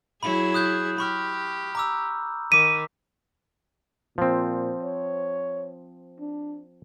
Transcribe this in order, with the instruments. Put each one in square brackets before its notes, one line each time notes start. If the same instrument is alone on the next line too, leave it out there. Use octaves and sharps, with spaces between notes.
[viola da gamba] F#3 E4 G#4 [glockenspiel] B5
[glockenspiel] D#6 F#6 G6
[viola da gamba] G4 [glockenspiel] B5 C#6 F6
[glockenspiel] A#5 D6 E6
[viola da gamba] D#3 [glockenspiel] D6 B6 [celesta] D#7
[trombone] A#2 [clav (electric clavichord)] F3 C4
[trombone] C#5
D4